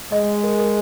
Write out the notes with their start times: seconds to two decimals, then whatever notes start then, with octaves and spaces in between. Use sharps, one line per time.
0.12 G#3 D#5
0.43 A#4
0.59 A#4